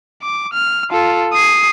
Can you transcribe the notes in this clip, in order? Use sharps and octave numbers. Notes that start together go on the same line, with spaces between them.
D6
F6
F4 A4
D#6 C7